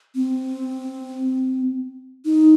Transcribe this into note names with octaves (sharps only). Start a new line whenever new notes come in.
C4
D#4